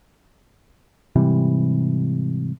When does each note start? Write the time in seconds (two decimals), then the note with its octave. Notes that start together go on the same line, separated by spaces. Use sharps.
1.16 G#2 C3 E3 G3